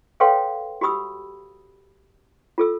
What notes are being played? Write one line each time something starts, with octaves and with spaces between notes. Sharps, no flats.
A4 B4 C#5 F5 G5 C6
F#4 G4 B5 D#6 E6
F4 A4 E6